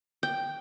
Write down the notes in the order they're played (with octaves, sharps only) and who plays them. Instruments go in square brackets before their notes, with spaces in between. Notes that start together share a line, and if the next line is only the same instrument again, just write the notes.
[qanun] G5